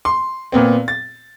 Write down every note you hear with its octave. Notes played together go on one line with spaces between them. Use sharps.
C6
A#2 B3 C4
A6